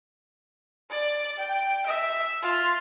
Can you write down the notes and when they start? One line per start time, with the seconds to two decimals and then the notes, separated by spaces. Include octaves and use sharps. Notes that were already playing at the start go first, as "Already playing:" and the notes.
0.90 D5
1.38 G5
1.86 E5
2.42 F4